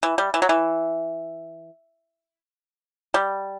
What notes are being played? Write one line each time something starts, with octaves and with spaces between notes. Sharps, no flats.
E3
G3
E3
F#3
E3
G3